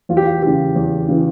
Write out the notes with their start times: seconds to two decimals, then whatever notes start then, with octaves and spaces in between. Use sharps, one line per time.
0.09 E2 F4
0.17 G4
0.26 F4
0.42 C#3 E3 G4
0.76 E2
1.09 C#3 E3